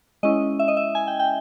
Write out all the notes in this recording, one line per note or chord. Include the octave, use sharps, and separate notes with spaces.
G#3 C#4 E4 D#5
E5
D#5
E5
G#5
G5
G5